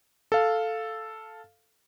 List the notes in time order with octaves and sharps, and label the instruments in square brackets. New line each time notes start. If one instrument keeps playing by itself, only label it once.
[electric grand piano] A4 F5